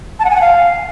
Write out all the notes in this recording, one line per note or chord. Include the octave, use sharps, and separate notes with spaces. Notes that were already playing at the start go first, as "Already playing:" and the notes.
A5
F#5
G#5
F#5
F5